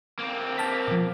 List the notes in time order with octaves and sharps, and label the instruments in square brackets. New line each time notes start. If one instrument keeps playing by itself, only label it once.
[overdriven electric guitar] A#3 C4
[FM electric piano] A5 F6 B6
B2 F3